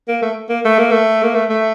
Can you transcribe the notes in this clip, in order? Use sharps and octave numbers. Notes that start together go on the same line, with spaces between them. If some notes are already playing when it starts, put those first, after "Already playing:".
A#3
A3
A#3
A3
A#3
A3
A#3
A3
A3